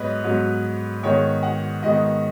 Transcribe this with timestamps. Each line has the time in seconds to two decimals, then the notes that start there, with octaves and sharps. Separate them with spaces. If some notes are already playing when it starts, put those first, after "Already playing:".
Already playing: G#2 F#3 B3 B4 C#5 D#5
0.24 G#2 F#3 B3
1.03 G#2 D#3 G#3 B3 C#5
1.43 F#5
1.82 G#2 D#3 G#3 B3 D#5